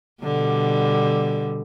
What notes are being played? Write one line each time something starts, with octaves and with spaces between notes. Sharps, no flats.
B2 D3 G3